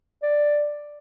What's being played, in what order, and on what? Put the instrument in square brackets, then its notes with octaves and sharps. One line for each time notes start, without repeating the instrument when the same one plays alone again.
[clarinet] D5